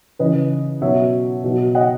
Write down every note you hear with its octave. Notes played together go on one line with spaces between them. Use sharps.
C#3 E3 B4 D#5
B2 F#3 C#5 E5
B2 F#3
D#5 F#5